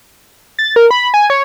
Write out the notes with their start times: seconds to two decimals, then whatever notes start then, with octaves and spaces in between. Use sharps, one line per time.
0.59 A6
0.76 A#4
0.91 B5
1.14 G#5
1.30 C#5